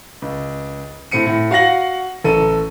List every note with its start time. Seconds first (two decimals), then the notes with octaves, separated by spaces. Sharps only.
0.22 C#2
1.11 A2 C4 C#7 D#7
1.26 A2
1.51 F#4 F5 F#5 A#6 F#7
2.24 A1 A4 D#7